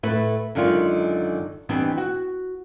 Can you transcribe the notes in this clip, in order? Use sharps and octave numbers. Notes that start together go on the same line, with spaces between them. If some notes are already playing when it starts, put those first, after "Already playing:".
A2 A3 B4
F#2 D3 D#3 G#3 F4 D5
D#3 E3 G3 B3 C4 D4
F#4